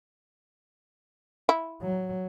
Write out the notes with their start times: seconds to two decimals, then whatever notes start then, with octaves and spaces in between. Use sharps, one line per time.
1.49 E4
1.82 F#3